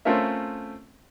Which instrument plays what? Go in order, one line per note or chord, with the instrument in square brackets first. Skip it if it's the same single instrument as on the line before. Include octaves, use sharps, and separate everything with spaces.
[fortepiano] A3 C4 C#4 F4 A#4 E5